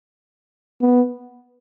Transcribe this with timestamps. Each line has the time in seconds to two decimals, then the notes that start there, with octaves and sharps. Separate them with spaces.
0.82 B3